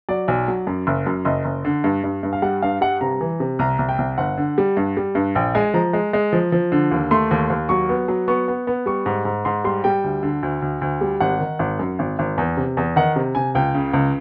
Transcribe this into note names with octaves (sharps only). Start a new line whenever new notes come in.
F#3 D5
B1
F#3
F#2
F#1
F#2
F#1 D#5
F#1
D3
G2
G2
G2
F5
G3 F#5
G2 F5
G3 F#5
C3 A#5
E3
C3
C2 A#5
C2
G5
C2
G1 F#5
D3
G3
G2
G3
G2
A#1 G5
G#3 G#5
F3 A#5
G#3
G#3
F3
F3
D3
D#2
A3 C6
D#2
D#2
F#3 C#6
B3
F#3
B3 C#6
B3
B3
G3 C#6
G#2
G#2
G#2 C6
G3 C6
G3 G5
D2
D3
D2
D2
D2
G3
G#1 F#5
D#3
G#1
F#2
G#1
G#1
E2
C3
E2
D#3 F#5
C3
C3 G#5
C#2 G5
C#3
C#2